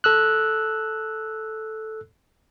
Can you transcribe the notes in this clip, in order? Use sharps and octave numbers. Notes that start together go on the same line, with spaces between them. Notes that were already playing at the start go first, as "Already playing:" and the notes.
A4 E6 F#6